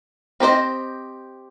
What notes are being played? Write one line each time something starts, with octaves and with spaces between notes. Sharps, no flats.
C4 G4 C5 D#5